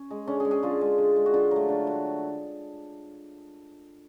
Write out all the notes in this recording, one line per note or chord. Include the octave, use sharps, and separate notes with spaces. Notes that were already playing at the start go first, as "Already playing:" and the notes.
Already playing: C#4
G#3
D3 C#4
G#3 G#4
G#4
D3 F4
G#3
D3
G#3
F#4
D3 F4
F#3 A3
D3
F#3 A3